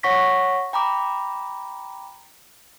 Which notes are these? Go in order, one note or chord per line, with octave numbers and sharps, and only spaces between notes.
C#5 F#5 C#6 A#6 B6
G5 A#5 B5 D6